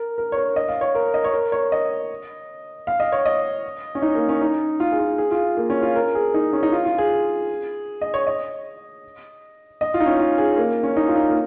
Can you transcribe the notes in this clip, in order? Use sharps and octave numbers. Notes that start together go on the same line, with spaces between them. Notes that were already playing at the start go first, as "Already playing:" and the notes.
Already playing: A#4
A#4
C#5
A#4
D#5
F5
C#5
A#4
D#5
C#5
A#4
C#5
D#5
F5
D#5
C#5
D#5
C#4
D#4
A#3
C#4
D#4
F4
G#4
F4
G#4
F4
A#3
C#4
F4
A#4
G#4
D#4
C#4
D#4
F4
F4
G#4
D#5
C#5
D#5
D#5
F4
D#4
C#4
F4
G#4
A#3
C#4
D#4
F4
D#4
A#3